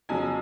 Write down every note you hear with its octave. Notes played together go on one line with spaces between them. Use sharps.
F2 C#3 F#3 G#5